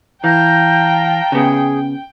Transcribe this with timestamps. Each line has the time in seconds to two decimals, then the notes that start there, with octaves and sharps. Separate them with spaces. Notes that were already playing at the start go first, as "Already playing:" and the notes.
0.24 E3 F5 G5 A5 A#5 G6
1.32 C#3 B3 G#4